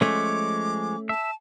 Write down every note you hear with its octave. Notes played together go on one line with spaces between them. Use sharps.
F3 G#3 A3 C#4 C#5 D6
E5 A5